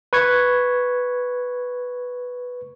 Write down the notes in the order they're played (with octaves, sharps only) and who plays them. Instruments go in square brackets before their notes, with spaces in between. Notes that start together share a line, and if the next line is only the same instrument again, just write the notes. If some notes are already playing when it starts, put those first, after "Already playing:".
[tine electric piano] B4 C#6 G#6